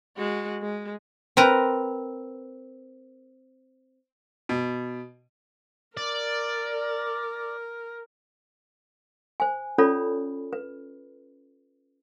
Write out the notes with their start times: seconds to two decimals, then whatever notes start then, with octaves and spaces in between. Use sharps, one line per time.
0.17 G#3 F#4
0.61 G#3
1.37 C4 A#4 B4 A#5
4.49 B2
5.97 A#4 D5
9.40 C5 G#5
9.78 C#4 F4 A4 C#5 D5 B5
10.53 B4